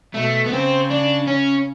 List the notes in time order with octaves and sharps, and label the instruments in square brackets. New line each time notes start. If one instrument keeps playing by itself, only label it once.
[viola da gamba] B2 [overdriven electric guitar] A3
[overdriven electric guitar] B3
[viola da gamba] C#3 [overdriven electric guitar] C4
[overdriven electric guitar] D4
C#4